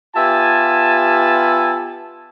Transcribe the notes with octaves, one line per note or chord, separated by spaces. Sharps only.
B3 F4 G4 E5 G#5 A5